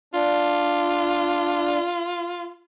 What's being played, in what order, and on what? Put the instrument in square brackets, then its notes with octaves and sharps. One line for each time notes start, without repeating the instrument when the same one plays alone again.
[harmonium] D4 [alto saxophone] F4